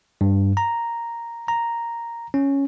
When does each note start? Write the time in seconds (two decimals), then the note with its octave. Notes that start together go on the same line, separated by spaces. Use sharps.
0.21 G2
0.57 A#5
1.48 A#5
2.34 C#4